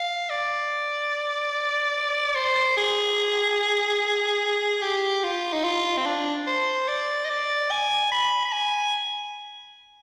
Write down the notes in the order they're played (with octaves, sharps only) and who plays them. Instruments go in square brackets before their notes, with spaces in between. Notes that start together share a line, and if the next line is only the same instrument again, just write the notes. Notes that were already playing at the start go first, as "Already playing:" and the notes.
Already playing: [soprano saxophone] F5
D5
C5
G#4
G4
F4
D#4
F4
C4
D4
C5
D5
D#5
D5
G#5
B5
B5
G#5